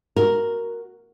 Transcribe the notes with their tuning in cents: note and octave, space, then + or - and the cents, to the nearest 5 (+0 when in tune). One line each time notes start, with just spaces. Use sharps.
F#4 +0 A#4 +0